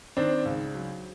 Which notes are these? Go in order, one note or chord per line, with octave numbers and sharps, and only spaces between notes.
D#3 C4 D4
C#2
F#3